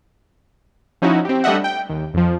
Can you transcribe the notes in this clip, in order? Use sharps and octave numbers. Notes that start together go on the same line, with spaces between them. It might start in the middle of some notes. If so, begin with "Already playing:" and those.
F3 C#4 D#4 E4 F#4
C4 G4
G3 A3 D4 D#5 E5 F#5
G5
D#2
F2 F3